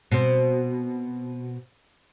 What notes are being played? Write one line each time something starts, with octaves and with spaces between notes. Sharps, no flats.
B2 C4